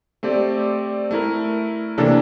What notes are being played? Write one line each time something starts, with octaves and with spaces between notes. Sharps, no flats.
A3 C4 G4 D5
A3 E4 A#4
C3 E3 A#3 D4 A4